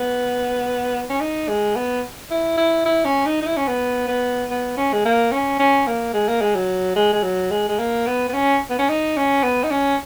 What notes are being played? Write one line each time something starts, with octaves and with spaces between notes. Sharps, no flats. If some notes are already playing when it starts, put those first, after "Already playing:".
Already playing: B3
C#4
D#4
G#3
B3
E4
E4
E4
C#4
D#4
D#4
E4
C#4
B3
B3
B3
C#4
G#3
A#3
C#4
C#4
A#3
G#3
A#3
G#3
F#3
G#3
G#3
F#3
G#3
G#3
A#3
B3
B3
C#4
B3
C#4
D#4
C#4
B3
D#4
C#4